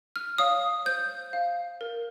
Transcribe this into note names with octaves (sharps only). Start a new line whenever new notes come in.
F6
C#5 F5 D#6
C5 G6
F5
A#4